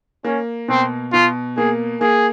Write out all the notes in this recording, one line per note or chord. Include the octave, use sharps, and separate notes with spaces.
A#3 C#4
B2 C4
B2 F4
A#3 G#4
A#3 G#4